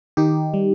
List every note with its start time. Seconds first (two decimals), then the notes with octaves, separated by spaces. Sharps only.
0.17 D#3 D#4 G4
0.54 G3